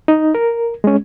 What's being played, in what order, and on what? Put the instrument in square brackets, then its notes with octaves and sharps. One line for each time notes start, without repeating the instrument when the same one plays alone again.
[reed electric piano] D#4
A#4
G#3 C#4